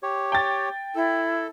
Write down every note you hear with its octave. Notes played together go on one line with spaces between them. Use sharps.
G4 C#5
G5 A6
E4 A4